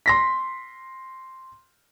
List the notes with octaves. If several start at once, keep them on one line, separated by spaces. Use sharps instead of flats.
C6 A#6 B6